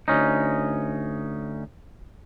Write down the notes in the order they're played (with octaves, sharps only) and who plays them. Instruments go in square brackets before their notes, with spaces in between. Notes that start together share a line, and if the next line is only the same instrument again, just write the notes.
[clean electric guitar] D2 C#4 D#4